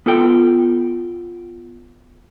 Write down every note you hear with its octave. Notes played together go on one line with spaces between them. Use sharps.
B3 F4 A4 G5